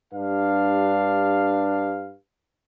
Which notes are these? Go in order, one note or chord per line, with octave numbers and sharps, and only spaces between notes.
G2 D4 G4 B4 F5